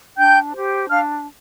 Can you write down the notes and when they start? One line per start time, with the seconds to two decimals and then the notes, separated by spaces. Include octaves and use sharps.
0.16 D4 G5 G6
0.53 G4 C5
0.88 D4 F5 F6